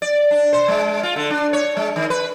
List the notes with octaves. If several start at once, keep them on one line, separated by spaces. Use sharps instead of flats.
D5
D4
C5
G#3
F4
D3
D4
C#5
G#3
D#3
B4